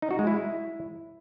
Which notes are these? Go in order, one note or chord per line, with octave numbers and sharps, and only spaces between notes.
D#4
F#4
G#3
E4